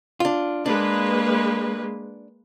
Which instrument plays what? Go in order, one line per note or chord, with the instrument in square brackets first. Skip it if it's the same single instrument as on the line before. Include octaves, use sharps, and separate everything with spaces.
[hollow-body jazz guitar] D4 F4
[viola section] G#3 A#3 B4 [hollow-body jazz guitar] D4